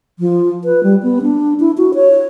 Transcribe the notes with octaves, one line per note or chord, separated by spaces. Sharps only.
F3
B4
G3
B3
D4
E4
F#4
C#5